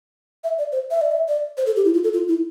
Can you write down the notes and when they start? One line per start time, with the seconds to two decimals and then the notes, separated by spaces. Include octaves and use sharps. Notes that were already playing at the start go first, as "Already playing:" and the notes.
0.44 E5
0.58 D5
0.72 C5
0.91 E5
1.01 D5
1.12 E5
1.28 D5
1.57 C5
1.66 A4
1.76 G4
1.85 E4
1.94 F4
2.04 A4
2.13 F4
2.28 E4